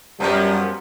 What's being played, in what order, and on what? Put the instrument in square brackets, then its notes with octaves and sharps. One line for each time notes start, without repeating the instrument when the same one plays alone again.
[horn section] F#2 [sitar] F3 B3 A#4 [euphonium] G3